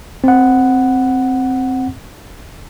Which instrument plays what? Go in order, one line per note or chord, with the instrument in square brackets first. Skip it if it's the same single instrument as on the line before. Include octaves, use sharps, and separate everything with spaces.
[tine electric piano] C4 F#5